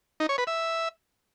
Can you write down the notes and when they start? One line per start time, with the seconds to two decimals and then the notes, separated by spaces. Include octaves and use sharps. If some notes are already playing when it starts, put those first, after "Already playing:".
0.20 D#4
0.29 C#5
0.38 B4
0.47 E5